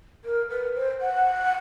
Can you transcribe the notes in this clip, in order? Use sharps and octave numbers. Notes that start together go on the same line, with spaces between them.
A#4
B4
C5
F#5